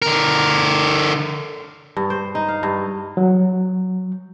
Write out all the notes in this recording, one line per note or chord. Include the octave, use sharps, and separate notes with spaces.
D3 A#4
G2
C5
D#4
F5
G2
F#3